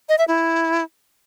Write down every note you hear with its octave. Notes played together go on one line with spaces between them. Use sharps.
D#5
E5
E4